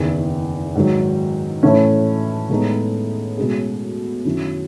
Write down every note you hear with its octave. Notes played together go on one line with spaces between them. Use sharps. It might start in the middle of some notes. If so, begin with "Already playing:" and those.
Already playing: F#1 E2 D#3
G#2 D#3 F#3
A2 E3 A3 C#4
A2 G#3 B3 D#4
B2 G#3 C#4 G#4
F#2 D#3 F#3 C#4 E4